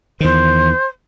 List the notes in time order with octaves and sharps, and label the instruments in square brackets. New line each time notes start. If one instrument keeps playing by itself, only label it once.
[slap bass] E2 D#3 [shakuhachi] C5